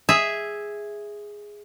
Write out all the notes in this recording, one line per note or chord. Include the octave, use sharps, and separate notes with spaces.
G#4 E5